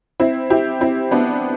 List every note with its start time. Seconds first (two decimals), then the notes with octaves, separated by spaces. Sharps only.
0.20 C4 E4
0.50 E4 G4
0.81 C4 E4
1.11 B3 D4